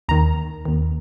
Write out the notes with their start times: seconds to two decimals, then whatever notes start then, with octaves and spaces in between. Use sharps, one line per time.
0.08 D#2 D#3 A#5
0.65 D#2 D#3